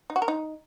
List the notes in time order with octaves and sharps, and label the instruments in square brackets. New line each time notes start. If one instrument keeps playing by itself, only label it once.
[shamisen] D#4
F#4
A#4
D#4